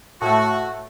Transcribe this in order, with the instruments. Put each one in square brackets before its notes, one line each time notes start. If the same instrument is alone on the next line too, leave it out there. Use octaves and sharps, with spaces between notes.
[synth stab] A2 A3 [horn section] F#4